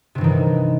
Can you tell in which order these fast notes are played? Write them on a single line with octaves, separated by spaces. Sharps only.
C3 G2 E3 D#3